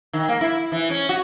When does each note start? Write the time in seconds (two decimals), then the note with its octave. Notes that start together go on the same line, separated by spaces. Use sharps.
0.13 D#3
0.29 A#3
0.41 E4
0.72 E3
0.90 C#4
1.09 F#4